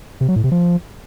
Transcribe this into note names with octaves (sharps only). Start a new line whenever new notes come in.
C3
F#3
A2
C3
F3